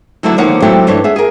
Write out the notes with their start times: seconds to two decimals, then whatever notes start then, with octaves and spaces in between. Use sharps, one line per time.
0.23 D3 F#3 A3 D4 E4 F#4
0.38 D3 D#3 F3 A#3 C#5 F#5
0.62 F#3 G3 A3 C4 E4 G4
0.87 G2 E3 D4 A4 C#5
1.04 G#4 E5 F#5
1.16 G#4 A#4